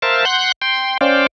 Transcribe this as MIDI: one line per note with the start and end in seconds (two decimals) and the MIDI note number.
0.02 0.25 70
0.02 0.25 72
0.02 0.25 76
0.02 0.25 77
0.02 0.25 81
0.25 0.52 78
0.25 0.52 84
0.25 0.52 90
0.25 0.52 91
0.62 0.98 79
0.62 0.98 84
1.01 1.27 61
1.01 1.27 72
1.01 1.27 74
1.01 1.27 77
1.01 1.27 79